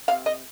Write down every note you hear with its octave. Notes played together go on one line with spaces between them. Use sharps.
C3 F5
D#5